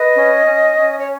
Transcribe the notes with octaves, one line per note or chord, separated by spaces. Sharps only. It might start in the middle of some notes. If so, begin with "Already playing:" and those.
Already playing: B4 D#5
C#4
C#4
C#4
C#5